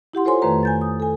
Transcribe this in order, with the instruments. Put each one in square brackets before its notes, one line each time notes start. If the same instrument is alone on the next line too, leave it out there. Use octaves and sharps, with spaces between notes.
[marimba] E4 G4 F#5 C6
F4 A4 C5 C#5 G#5 C6
F2 D#3 A3 B4 A#5
G#5 G6 A6
D#6
A4 G#5